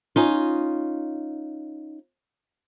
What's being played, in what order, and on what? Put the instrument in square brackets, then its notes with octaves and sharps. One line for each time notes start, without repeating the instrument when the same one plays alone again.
[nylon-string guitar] C#4 D#4 F4